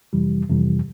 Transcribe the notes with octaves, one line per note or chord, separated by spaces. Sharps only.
F2 C3 E3 G3
F2 C3 E3 G3